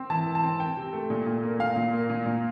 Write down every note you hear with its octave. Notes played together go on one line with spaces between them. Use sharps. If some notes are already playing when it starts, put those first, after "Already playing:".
Already playing: C4
E3 A5
E3
A5
C4
C4 G5
C3
A3
A#2
A#2
A#3
A#2 F5
A#2
A#3
A#2
A#2